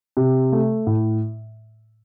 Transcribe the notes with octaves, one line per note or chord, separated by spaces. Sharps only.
C3
A3
A2